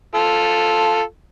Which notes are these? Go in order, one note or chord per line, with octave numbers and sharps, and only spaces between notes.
F4 A4